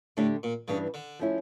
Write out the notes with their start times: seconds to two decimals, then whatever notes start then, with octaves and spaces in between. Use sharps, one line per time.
0.17 A2 D3 A3 D4 G4
0.43 A#2
0.68 G2 C#3 E3 G3 D4
0.94 D3
1.19 F3 A3 C#4 E4